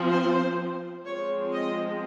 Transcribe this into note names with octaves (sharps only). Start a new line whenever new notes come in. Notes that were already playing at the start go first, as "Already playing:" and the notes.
Already playing: F3 C4
C5
F3 G#3 C4 C#5
D#5